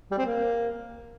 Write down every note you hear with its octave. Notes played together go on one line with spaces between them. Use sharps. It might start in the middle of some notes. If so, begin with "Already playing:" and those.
G3
C4
A#3